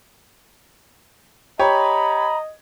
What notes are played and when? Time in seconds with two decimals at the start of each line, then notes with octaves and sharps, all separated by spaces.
1.59 G4 C#5 D#5 A#5 B5